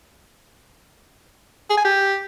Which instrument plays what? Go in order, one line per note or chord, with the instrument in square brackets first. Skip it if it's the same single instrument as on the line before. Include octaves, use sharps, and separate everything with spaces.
[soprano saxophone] G#4
G#5
G4